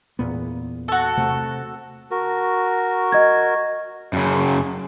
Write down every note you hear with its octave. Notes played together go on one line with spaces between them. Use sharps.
E2 A#2 B3
F#4 A4
C3 A3
F#4 A#4
D#5 G#6
F#2 C#3